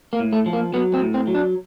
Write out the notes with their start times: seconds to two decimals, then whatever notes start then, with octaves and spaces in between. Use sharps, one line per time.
0.13 A#3
0.19 A2
0.33 A3
0.46 F3
0.53 A#3
0.73 F#3 B3
0.94 C4
1.01 A2
1.14 C4
1.27 F#3
1.34 D4